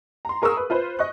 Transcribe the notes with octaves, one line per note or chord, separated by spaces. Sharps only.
A#5 C6
G#4 A#4 C#6 D#6 E6
B4
F4 B4 C5
D#5 C#6 F#6